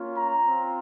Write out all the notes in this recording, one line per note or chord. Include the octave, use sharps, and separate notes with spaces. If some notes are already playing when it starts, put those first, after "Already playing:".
Already playing: A#3 C#4 F4
A#5
C4 F4